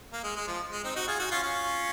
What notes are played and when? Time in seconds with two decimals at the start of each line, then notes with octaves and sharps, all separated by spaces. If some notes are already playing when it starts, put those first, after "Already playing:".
0.13 A#3
0.24 G#3
0.36 G#3
0.47 F3
0.72 G#3
0.84 C4 D#4
0.96 D#4 F#4
1.07 F4 G#4
1.19 D#4 F#4
1.31 C#4 F4
1.43 C#4 F4